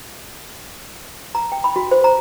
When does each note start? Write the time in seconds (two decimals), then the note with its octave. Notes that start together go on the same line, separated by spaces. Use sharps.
1.35 A#5
1.52 G5
1.64 B5
1.76 F#4
1.91 C5
2.04 A#5